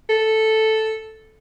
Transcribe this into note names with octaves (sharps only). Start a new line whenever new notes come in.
A4